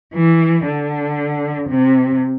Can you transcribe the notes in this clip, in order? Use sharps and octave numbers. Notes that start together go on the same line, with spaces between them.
E3
D3
C3